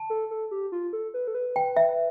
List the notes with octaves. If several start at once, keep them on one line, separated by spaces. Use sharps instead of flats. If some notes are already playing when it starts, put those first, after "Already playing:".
Already playing: A5
A4
A4
G4
F4
A4
B4
A4
B4
G5
E5